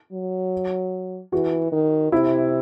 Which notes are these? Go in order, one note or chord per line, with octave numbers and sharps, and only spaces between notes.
F#3
E3 F#4
D#3
C3 E4